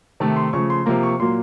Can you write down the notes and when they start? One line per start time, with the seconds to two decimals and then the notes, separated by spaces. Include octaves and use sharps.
0.20 C3 D#3 A3 A5
0.36 C6
0.53 C#3 F3 A3 C#6
0.70 C6
0.86 C3 F3 A#3 A#5
1.03 C#6
1.20 A#2 F#3 A#3 C6